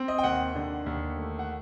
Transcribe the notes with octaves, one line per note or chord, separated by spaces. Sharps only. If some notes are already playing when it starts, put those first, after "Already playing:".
Already playing: C4
D#5
G5
D#2 F#5
D3
D#2
A3
F#5